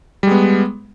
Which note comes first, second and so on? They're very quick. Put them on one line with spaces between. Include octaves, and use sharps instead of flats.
G3 G#3 B3